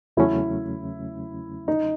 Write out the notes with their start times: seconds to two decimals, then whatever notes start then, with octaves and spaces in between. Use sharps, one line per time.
0.17 E2 C#3 F#3 A3 C#4 E4
1.68 D#4